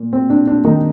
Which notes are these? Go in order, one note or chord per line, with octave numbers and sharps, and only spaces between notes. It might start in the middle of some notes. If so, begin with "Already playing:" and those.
Already playing: A#2
C4
D4
D4
D#3 D#4